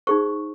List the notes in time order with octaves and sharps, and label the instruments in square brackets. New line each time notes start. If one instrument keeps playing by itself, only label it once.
[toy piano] D#4 G#4 C5 C#6